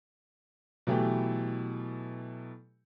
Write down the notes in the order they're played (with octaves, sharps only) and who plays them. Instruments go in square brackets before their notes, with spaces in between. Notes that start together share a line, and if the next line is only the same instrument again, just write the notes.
[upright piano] B2 E3 F#3 A3 E4 G4